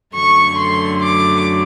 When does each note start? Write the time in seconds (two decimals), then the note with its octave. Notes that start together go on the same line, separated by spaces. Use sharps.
0.15 F#2 D3 F#3 A3 C#6
0.58 C6
1.02 D6